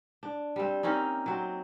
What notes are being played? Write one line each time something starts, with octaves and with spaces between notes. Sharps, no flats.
D4
G3 C4
A#3 C4 C#4 D#4
F#3 C4